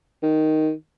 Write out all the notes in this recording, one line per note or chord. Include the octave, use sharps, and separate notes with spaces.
D#3